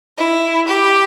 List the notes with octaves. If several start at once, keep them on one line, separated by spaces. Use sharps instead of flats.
E4
G4